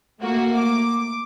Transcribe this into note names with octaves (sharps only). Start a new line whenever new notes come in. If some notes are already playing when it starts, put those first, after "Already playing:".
A3 A#3 F#4
D6